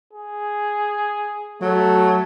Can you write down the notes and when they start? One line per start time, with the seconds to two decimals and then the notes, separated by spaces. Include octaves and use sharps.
0.13 G#4
1.61 F#3 A3